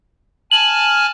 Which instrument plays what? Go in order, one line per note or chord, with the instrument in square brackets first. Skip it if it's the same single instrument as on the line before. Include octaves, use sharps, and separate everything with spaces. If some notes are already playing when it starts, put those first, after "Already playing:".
[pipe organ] G#5 A5 F6 [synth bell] F#7